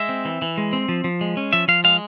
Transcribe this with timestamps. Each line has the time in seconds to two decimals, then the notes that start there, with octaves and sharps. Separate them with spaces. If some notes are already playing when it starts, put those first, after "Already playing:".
Already playing: G#3 E5
0.09 C4
0.25 E3
0.42 E3
0.58 G#3
0.73 C4
0.89 F3
1.04 F3
1.21 G#3
1.37 C#4
1.53 F3 E5
1.68 F3 F5
1.84 G#3 F5